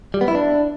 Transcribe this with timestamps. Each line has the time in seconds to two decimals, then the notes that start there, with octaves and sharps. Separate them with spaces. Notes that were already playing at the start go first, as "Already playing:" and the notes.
0.14 G3
0.21 B3
0.28 E4
0.35 D4